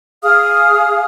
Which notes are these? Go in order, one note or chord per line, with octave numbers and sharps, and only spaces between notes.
G#4 F5 D#6 F6